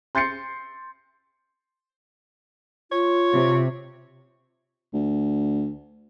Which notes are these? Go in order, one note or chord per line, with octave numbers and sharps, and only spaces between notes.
C6 G6 A6 C7 C#7
F4 C#5
C3
D2